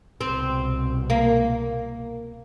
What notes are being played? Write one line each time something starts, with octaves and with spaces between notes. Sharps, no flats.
C2 B2 C4
A#3